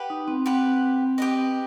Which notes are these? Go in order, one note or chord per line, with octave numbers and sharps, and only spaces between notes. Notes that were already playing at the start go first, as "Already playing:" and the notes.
Already playing: G4 B4 F#5
D#4
C4
C4 G4 B4 F#5
G4 B4 D#5